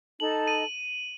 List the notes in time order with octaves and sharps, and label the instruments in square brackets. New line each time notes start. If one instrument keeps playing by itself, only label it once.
[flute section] D#4 A4 D#5 A5 [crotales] F#7
[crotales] D#7